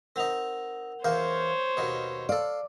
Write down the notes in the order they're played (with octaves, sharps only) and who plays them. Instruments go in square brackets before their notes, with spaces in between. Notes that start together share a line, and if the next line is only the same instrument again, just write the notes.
[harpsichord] C4 D#4 [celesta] A#4 F#5 F7
[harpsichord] E2 A#3 F5 [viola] C5 C#5 [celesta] G6
[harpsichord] D#2 B2 D#3
[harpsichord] A4 F5 [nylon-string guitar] D5